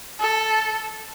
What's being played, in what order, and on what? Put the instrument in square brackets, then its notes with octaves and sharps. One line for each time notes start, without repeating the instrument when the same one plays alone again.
[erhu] A4